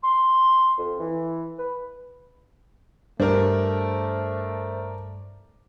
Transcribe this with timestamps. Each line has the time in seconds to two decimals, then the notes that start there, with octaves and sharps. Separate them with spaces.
0.03 C6
0.78 F2
1.00 E3
1.59 B4
3.20 G2 A3 D4 A#4 C5